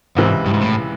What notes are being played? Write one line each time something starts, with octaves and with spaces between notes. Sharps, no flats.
C#2 G#2 C3 E3
G2
G#2
A2